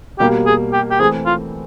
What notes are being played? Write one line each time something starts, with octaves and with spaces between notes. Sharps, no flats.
B2 G3 A#3 G4
G#4
G4
G4
E3 A3 C4 G#4
F4